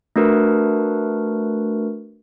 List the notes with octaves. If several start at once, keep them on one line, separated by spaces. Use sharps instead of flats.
A3 D4 F#4 A#4 B4